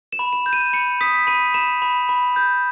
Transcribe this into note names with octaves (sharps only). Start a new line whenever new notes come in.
E7
B5
E7
G6
D#7
B5 C#7
D#6 B6
B5 D#7
B5 E7
B5
B5
G6